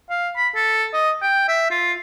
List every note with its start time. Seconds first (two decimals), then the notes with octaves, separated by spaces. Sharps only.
0.10 F5
0.37 B5
0.56 A4
0.94 D#5
1.22 G5
1.48 E5
1.71 F4